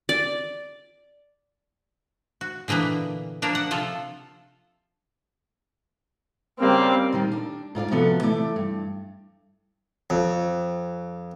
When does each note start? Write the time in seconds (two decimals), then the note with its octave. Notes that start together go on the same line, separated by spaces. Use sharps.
0.09 D5
2.41 F#4
2.68 A#2 D3 E3 A#3 B3
3.42 F3 A#3 D4 A#4
3.55 F#5
3.71 C3 F3 F4 A4
6.60 C#3 G3 A#3 C4 F5
7.12 A#2 D#3 G3
7.32 D4
7.75 G#2 F4 D5 F5
7.91 C3 F3 B3 F#4 A4
8.22 E3 A3 D5 E5
8.56 G2
10.10 F2